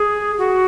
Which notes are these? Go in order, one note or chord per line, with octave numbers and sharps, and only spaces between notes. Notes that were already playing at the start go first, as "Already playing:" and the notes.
Already playing: G#4
F#4